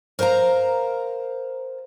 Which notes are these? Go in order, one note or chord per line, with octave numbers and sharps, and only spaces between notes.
A#4 C5 F5 G#5 A#5